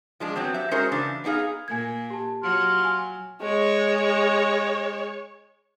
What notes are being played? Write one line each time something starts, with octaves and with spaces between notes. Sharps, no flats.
F3 G#3 D4
F#3 B3 C4
G4 E5
G#3 C#4 F#4 G#4 A#4 C5
C#3 E3 D4
B3 D4 D#4 G#4 F5
A#2 G#5 G#6
G4 A5
F#3 F4
G#5
G#3 C#5